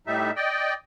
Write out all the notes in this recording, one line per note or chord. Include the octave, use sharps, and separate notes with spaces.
A2 G3 D#4 E5
D5 D#5 G5